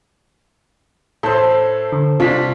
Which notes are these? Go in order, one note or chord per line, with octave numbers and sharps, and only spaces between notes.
A2 A4 C5
D3
C2 C3 D4 F4 B6